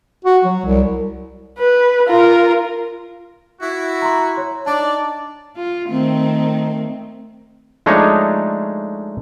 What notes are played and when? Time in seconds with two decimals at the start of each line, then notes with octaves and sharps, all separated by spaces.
0.25 F#4
0.45 F#3
0.66 C2
1.59 B4
2.08 F4 A#4
3.61 E4 F#4
4.02 A#5 C6
4.37 C#5
4.66 D4 D#4 D5 A5
5.56 F4
5.89 D#3 A3 C4
7.86 F3 G#3 A3 D4 D#4 C#5